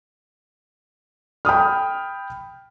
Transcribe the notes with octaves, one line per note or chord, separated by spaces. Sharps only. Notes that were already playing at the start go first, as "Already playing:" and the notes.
G5 B5 D#6 F6